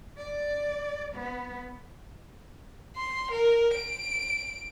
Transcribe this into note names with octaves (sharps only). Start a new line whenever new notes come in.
D5
B3
C6
A#4
D7